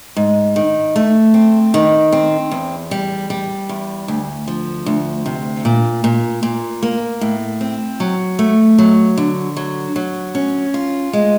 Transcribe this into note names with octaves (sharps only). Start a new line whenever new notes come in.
G#2
D#3
A3
C4
D#3
C4
E2
G3
G3
E2
D2
F3
D2
C3
A#2
A#2
A#2
A#3
A2
C4
F#3
A3
F#3
D3
F#3
F#3
C#4
F4
G#3